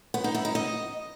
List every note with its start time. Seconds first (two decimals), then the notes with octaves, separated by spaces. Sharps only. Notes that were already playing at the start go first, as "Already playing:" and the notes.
0.14 B3
0.24 D#4
0.35 E4
0.45 D#4
0.55 D#5